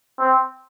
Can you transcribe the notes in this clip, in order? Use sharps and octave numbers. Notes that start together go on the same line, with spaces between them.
C4